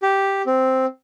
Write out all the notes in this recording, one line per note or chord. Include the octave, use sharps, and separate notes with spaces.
G4
C4